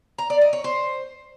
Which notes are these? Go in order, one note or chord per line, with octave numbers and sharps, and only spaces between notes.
A#5
D5
D#5
C#5
C5